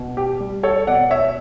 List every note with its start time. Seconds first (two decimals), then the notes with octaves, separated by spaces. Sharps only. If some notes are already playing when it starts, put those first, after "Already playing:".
Already playing: B2
0.17 G4
0.40 G3
0.63 A4 C#5
0.87 B2 D5 F#5
1.11 C#5 E5